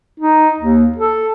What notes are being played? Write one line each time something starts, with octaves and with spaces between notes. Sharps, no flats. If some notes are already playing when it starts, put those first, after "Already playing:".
D#4
D#2
A4